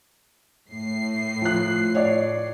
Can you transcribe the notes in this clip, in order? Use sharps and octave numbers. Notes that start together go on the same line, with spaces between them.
A2 C7
F3 F#6
C#5 D5